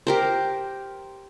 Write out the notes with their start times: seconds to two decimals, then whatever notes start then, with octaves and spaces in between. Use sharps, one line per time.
0.07 G4 A#4 C5